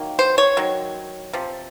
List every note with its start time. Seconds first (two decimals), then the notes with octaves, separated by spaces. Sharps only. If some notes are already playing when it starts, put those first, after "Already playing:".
Already playing: D#3 F#3 A#3
0.19 C5
0.38 C#5
0.57 D#3 F#3
1.33 C3 F3